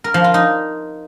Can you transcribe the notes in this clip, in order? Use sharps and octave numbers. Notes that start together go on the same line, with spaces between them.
A#4
F3
F4
D#4